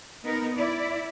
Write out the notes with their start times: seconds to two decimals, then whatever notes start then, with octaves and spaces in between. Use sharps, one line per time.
0.24 B3 D#4 A#4
0.56 E4 D5